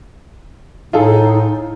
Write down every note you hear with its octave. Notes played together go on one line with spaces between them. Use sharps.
A2 D#4 F4 G#4 A4